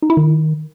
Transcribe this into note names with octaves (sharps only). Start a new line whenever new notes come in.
D#4
E4
D#3